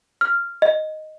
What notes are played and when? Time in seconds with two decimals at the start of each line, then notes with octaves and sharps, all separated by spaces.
0.21 F6
0.62 D#5